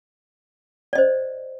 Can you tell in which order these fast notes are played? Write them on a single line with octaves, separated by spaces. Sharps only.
D5 D#5 C5